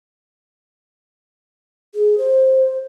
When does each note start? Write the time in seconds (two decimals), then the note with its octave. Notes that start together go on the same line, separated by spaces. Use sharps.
1.94 G#4
2.18 C5